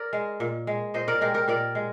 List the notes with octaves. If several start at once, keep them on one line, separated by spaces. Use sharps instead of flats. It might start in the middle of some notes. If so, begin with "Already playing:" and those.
Already playing: A#4 D5
G#3
A#2
G#3
A#2 C5 D#5
A#4 D5
G#3 G4 A#4
G4 A#4
A#2 A#4 D5
G#3